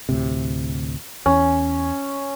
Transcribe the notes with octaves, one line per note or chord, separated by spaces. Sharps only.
D2 A2 C3
E2 C#4